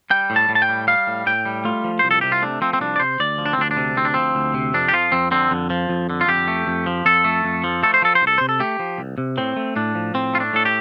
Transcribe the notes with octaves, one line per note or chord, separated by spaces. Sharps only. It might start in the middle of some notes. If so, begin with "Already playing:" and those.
G3 G5
A2
A5
A2
A5
G5
G3
G3 F5
A2
A2 G5
G3
A3 F4
F3
C2 C5
A4
C3 G4
F4
A3 D4
F3 C4
C4
C2 D4
D5
C3 C5
D2 D5
F3
D4
C4
D2 D4
D4
C3
D2 C4
D4
F3 C4
D2
C3
F2 D4
G4
F3 F4
F2 C4
D3 C4
F2
F3
F2
D3
F4
F2 G4
A3
F2
F3
F2 A4
A3
F2
F3
A3 A4
C5
F3 A4
C5
C2
A4
C3 C5
A4
A3 G4
F3
C2
C3
A2 C4
A3
A2 D4
F3
A2 C4
A3 F4
D4
A2 A4
G4